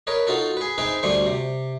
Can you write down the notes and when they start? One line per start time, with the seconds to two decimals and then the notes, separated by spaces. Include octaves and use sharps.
0.07 A#4 B4 C#5 D#5
0.27 D#4 F4 F#4 A4
0.57 G#4 B4
0.78 C4 D#4 G#4 B4 E5
1.03 D2 D3 G3 A3 C5 C#6
1.26 C3